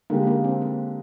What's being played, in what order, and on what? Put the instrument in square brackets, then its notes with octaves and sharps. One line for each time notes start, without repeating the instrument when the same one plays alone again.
[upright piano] D3 G#3 D#4 G4 [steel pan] A#3
[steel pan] A#3
C4
A#3